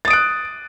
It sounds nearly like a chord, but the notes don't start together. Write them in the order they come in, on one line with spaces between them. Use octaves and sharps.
A6 D#6 D7 F#6